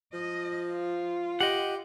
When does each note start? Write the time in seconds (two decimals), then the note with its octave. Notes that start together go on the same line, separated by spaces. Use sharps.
0.14 F3 D#5
0.71 F4
1.41 G4 D#5 F#5